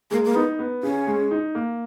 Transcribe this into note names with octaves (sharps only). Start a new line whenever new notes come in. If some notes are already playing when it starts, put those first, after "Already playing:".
G#3 A#3
A#3
B3 D#4
B3
C#3 C#4
G#3
D#4
A#3